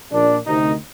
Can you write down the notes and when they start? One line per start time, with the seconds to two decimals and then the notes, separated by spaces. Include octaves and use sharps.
0.12 A#1 A#2 D4
0.47 D2 C3 D#3 D#4